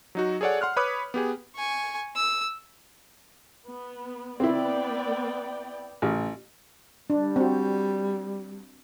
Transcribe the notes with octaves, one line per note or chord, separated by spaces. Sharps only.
F#3 D#4 F#4
G#4 A4 C#5 D5 F#5
F#5 C6 F6 F#6
B4 C#5 B5 D6 D#6 F#6
B3 G4 G#4
G#5 C#6
E6
B3
B3 C4 E4 D5 G5
A1
G3 D4
C4 F#4